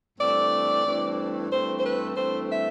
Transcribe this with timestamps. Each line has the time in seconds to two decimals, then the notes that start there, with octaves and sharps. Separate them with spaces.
0.18 G2 E3 A3 C4 D5
0.83 G2 E3 A3 C4
1.50 G2 E3 A3 C4 C5
1.79 C5
1.83 B4
2.16 G2 E3 A3 C4 C5
2.49 E5